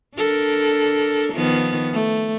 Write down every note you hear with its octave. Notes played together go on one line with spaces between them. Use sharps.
D4 A4 A#4
D#3 F3 B3
A3